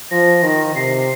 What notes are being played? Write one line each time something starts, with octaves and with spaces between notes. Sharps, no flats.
F3 A#6
D#3
C3 C7